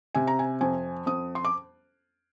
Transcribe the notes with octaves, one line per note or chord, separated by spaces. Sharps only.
C3 G#5
A#5
G#5
F2 G#5
F2 D#6
C6
D6